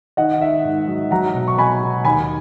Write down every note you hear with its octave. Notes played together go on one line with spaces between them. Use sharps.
D#3 D#5 F#5
D#3 E5
G#2
F#3
F#3 F#5 A#5
B2
C#6
B2 G#5 B5
B2
D#2 G#5 B5